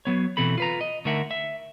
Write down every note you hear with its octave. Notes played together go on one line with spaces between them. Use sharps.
F#3 B3 C#5
B2 E3 C4 A4 B5
F4 B4 A#5
D#5
D3 A3 D#4 A#4 E5 F#5
E5